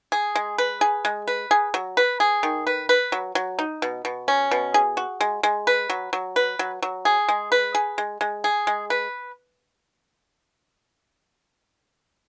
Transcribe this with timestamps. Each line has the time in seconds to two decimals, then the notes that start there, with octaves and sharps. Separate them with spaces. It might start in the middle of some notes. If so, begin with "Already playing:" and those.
0.12 G#4
0.35 G#3
0.58 B4
0.81 G#4
1.05 G#3
1.27 B4
1.51 G#4
1.74 F#3
1.97 B4
2.20 G#4
2.43 D#3
2.67 B4
2.89 B4
3.12 F#3
3.35 F#3
3.59 D#4
3.82 B2
4.05 B2
4.28 C#4
4.51 B2
4.74 G#4
4.97 F#4
5.21 G#3
5.43 G#3
5.67 B4
5.90 F#3
6.13 F#3
6.36 B4
6.59 F#3
6.82 F#3
7.05 G#4
7.29 G#3
7.52 B4
7.75 G#4
7.98 G#3
8.21 G#3
8.44 G#4
8.67 G#3
8.90 B4